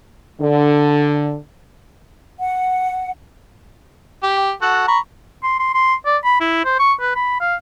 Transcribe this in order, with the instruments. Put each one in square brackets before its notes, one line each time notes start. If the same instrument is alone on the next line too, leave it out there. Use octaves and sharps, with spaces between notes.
[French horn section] D3
[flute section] F#5
[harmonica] G4 G5
F#4 A4 F#5
A#5 B5 C#6
[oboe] C6
C6
C6
D5
B5
E4
C5
C#6
B4
B5
F5